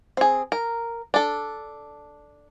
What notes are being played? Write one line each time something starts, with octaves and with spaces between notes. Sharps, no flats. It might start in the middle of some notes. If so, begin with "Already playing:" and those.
C4 G#4
A#4
D4 A4